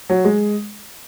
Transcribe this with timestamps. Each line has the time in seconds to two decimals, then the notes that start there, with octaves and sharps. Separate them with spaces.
0.09 F#3
0.25 G#3